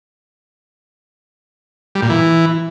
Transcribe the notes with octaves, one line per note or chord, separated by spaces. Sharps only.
G3
A#2
E3